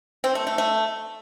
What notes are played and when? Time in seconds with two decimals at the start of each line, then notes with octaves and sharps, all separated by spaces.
0.24 C4
0.35 A3
0.47 A3
0.58 A3